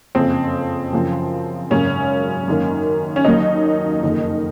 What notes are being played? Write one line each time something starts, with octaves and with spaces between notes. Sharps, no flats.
F#1 F2 C#3 C4
F#2 C#3 F3
G#1 F#2 C#3 F#3 A#3 C#4
F#2 D#3 A#3
C#4
D#2 D#3 F#3 A#3 D#4
F#1 F2 D#3